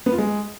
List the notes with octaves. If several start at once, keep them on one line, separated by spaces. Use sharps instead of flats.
B3
F4
G#3